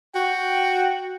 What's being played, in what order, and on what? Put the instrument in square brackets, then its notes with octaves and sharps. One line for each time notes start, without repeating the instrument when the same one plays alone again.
[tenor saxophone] F#4 [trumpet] G5